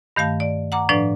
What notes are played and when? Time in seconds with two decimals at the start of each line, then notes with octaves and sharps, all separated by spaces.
0.16 G2 D#3 A3 F5 A5
0.40 D5
0.72 F#5 A#5 D6
0.89 A2 F3 D4 B4 D5